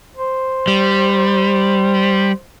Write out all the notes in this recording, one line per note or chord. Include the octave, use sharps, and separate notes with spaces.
C5
G3